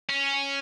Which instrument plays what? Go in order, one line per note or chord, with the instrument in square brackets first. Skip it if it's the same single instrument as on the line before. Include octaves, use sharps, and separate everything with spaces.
[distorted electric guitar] C#4